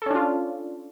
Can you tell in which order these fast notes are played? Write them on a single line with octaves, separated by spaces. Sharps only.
A4 C#4 D4 F4